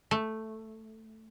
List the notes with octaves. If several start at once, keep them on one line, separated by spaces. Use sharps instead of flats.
A3